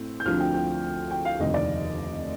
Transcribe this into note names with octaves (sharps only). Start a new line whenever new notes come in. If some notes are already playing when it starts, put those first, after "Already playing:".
Already playing: A2 A3 C4
G6
D2 D3 F3 C4 F6
G5
G5
G5
F5
F1 D#2 D3 D#5
D5